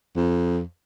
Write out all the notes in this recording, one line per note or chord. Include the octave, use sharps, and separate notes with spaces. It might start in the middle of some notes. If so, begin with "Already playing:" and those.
F2